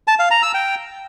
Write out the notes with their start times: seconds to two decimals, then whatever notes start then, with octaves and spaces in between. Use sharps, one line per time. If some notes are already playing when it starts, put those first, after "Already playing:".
0.08 A5
0.19 F5
0.31 A#5
0.43 E6
0.54 G5